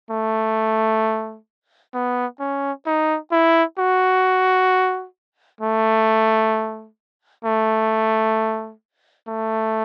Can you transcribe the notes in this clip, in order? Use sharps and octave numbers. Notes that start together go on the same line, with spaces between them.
A3
B3
C#4
D#4
E4
F#4
A3
A3
A3